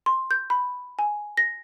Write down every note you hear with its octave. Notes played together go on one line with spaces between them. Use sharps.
C6
G6
B5
G#5
A#6